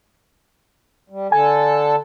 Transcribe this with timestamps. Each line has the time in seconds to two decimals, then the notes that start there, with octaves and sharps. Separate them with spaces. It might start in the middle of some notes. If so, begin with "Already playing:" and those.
1.10 G3
1.32 D3 A4 G#5 A5